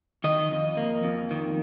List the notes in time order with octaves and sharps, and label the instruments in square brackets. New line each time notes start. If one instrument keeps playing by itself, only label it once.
[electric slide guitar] D#3 D#5
F2
A#3
F2
D#3